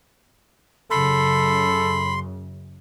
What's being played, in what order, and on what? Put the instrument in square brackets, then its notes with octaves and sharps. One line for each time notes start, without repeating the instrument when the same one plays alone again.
[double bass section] F#2 C#3 [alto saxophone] A4 [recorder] B5 [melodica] C6